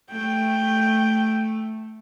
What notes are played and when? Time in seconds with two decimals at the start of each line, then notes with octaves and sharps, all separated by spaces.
0.11 A3 G5